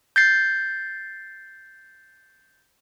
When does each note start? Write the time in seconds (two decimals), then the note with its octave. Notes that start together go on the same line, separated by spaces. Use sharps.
0.16 G6 A6 C7